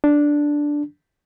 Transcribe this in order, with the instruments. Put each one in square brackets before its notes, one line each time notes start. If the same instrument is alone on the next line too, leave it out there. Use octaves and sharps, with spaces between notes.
[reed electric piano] D4